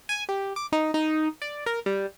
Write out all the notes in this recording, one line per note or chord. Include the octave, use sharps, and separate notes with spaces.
G#5
G4
D6
D#4
D#4
D5
A#4
G3